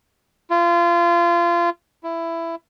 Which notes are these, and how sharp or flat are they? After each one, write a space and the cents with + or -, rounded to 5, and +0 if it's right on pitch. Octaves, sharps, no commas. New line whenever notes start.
F4 -25
E4 +15